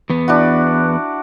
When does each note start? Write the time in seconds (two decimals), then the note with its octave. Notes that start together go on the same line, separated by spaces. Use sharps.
0.10 E2 B3
0.28 D4 E4 F#4